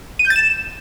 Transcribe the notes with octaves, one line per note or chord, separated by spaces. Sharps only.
D#7
G6
A6
E7